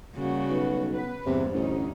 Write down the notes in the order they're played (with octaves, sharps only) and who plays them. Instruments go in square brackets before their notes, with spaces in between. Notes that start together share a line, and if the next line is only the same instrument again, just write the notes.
[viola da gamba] C#3 [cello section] G3 F#4 [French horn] A#3
[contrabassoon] B1 [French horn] B4
[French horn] B3 [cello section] B4
[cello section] E2 [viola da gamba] G2 [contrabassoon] C3 [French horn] C5
[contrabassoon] A1 [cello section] D2 C#4 D#4